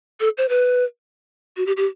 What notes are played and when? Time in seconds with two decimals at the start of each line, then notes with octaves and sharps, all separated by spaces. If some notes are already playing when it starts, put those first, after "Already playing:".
0.20 A4
0.38 C5
0.49 B4
1.57 F#4
1.66 G4
1.77 G4